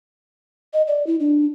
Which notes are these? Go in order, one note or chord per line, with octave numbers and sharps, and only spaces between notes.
D#5
D5
E4
D4